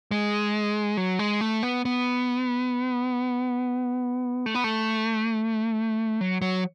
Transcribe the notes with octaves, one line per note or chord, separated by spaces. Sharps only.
G#3
F#3
G#3
A3
B3
B3
A3
B3
A3
F#3
F#3